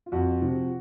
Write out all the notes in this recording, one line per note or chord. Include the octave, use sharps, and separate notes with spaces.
F4
F2 F#4
C3 F3